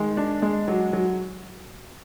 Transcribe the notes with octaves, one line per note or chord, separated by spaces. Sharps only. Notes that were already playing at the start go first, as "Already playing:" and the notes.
Already playing: D#3 G#3
D4
G#3
F#3
F#3